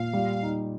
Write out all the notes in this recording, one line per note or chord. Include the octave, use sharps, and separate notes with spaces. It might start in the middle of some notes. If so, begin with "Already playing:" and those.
Already playing: A#2 F5
G3
D#4